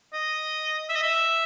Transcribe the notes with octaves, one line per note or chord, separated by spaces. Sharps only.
D#5
E5
D#5
E5